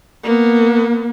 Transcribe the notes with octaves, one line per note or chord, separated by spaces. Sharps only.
A#3 B3